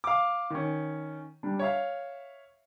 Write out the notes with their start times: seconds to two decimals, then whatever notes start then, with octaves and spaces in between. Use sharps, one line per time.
0.04 F5 D6
0.50 D#3 C#4
1.43 G3 D4
1.59 C#5 E5 F5